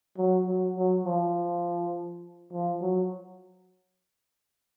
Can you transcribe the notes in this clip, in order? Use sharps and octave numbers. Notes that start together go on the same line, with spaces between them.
F#3
F#3
F#3
F3
F3
F#3